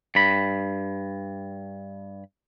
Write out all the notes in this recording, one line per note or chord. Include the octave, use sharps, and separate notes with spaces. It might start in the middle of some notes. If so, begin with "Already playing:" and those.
G2 B5